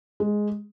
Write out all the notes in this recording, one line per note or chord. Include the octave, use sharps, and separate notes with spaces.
G#3